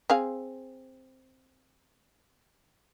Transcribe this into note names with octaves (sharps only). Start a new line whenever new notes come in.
C4 G#4 F5